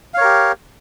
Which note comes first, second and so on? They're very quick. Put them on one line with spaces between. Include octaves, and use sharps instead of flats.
F5 C#5 A#4 G4